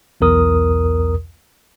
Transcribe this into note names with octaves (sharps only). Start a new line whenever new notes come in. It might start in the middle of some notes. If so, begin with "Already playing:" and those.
B1 E2 A#4 D#6